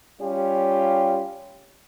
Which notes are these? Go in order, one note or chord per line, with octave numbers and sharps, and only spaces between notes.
G3 C#4 F4 G4